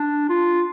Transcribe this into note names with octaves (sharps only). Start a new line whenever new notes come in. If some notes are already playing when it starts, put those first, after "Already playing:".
Already playing: D4
F4